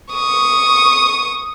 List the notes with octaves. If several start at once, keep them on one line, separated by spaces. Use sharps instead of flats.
C#6 D#6